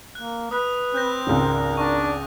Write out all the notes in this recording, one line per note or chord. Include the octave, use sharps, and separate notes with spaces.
A#3 F#6
B4 D#6 F#6
C4 F#6 G6 A#6
G#1 C#2 A#4
D4 C#6